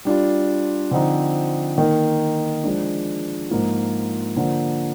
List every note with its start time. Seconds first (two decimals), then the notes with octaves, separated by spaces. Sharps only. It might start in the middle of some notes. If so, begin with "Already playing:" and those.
0.05 G3 D4 F4
0.91 D3 F3 C4 D#4
1.78 D#3 A#3 D#4 A#4
2.64 F3 G#3 D4
3.51 G#2 F3 A#3 F4
4.36 D3 F3 A#3